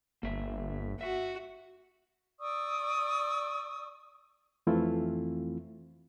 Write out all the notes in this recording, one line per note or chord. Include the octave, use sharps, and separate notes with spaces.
G1 A#3 E5
F#4 E5
D5 C#6 D#6 E6
F2 E3 A3 C4 E4 F4